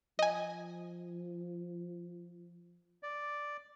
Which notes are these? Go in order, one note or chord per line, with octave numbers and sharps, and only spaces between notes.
F3 D#5 G#5
D5